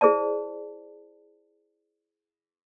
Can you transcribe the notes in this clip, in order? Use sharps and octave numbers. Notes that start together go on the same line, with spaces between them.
E4 G#4 C5 D5 A5